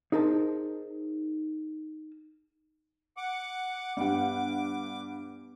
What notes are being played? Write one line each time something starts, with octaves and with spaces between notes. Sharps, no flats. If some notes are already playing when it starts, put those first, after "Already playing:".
D#4 G#4 A#4 C5 A5
F#5 D6
G2 B3 G4 F#5 D6